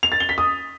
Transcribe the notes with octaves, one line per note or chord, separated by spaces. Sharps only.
F7
A6
G7
B6
D#6